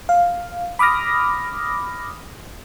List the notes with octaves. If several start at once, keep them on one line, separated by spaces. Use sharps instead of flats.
F5
B5 D6 D#6 F6 A#6